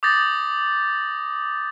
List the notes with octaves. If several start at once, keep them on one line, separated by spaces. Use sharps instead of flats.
D6 D#6 G6 A6 A#6